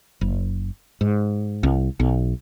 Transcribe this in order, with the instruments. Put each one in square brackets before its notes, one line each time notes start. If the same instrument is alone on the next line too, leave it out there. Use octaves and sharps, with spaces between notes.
[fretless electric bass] F#1
G#2
C2
B1